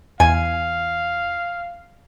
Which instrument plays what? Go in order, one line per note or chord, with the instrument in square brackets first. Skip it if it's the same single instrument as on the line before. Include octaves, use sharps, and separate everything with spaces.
[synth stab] E2 [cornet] F5 [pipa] G#5